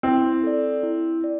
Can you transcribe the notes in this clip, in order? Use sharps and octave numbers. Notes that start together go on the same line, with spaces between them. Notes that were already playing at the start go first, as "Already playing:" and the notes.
C4 E4
A4 D5
E4
D5